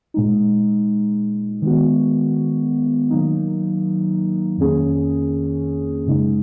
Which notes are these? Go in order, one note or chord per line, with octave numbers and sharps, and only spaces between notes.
A#2 G#3 D#4
D#3 G#3 B3 F#4
D#3 F#3 A#3 D#4
F2 D#3 A#3 C#4 G#4
F#2 C#3 G#3 D#4